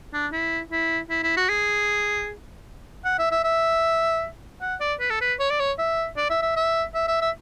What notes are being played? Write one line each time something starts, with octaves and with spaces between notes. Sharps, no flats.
D4
E4
E4
E4
E4
F#4
G#4
F#5
E5
E5
E5
F#5
D5
B4
A4
B4
C#5
D5
C#5
E5
D5
E5
E5
E5
E5
E5
E5